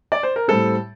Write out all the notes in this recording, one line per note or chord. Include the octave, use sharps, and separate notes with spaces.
D5
C5
A#4
A2 G3 C4 A4